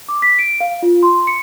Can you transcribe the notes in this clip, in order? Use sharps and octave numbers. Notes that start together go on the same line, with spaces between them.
D6
B6
D7
F5
F4
C6
C#7